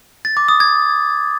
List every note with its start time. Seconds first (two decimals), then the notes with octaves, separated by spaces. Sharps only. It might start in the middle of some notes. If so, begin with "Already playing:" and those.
0.25 A6
0.37 D6
0.48 D#6
0.60 G#6